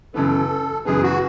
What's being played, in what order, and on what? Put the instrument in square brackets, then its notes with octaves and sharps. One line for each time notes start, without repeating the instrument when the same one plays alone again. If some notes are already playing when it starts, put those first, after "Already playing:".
[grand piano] F#2 C#3 E3 B3 [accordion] A4
[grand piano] F#2 C#3 E3 B3 [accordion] G#4
[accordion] F#4